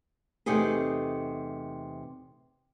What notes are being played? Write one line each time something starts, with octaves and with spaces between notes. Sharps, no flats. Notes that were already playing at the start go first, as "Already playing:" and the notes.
E2 C3 A3 D#4 G4 G#4